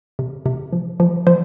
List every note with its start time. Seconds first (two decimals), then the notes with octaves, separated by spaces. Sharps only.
0.19 C3
0.46 C3
0.73 F3
1.00 F3
1.27 F3 C5